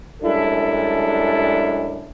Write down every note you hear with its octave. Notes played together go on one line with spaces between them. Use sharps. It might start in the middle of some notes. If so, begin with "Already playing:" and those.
F#2 G3 G#3 D4 E4 A4